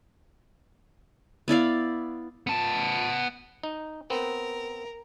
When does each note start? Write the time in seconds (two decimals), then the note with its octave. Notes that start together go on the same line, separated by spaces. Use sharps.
1.48 B3 E4 D5 F5
2.47 B3 A5
3.63 D#4
4.10 B3 C4 A#4